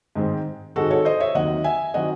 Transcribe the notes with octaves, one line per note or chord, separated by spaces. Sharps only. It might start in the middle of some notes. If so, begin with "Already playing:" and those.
G#2 D#3 G#3 C4
G#2 D#3 G#3 C4 F#4 A4
A4 C#5
C5 D#5
C#5 E5
D#2 D#3 F#3 C4 D#5 F#5
E5 G#5
D#3 F#3 C4 D#5 F#5